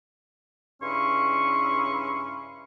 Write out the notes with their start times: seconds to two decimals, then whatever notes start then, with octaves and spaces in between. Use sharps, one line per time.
0.83 G2 C#3 C#4 E4 C6 C#6